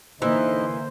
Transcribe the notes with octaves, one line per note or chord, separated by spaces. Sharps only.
D3 E3 A#3 D#4 C5 D#5